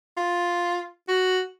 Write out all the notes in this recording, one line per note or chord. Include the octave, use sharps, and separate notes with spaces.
F4
F#4